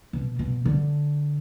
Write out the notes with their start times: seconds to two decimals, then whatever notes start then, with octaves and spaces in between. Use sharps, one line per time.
0.13 B2
0.39 B2
0.65 D3